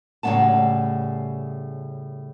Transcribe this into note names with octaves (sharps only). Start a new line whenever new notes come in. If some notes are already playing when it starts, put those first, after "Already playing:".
A2 C#3 G3 B3 F#5 A5